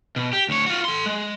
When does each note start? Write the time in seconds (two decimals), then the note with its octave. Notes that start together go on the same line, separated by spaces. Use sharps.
0.16 B2
0.33 G4
0.49 D2 C#5
0.66 F4 F#4
0.85 A4 C6
1.06 G#3